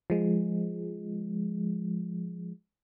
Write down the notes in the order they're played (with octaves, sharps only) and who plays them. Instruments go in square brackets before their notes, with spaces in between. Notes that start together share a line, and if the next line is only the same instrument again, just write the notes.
[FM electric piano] F3 G#3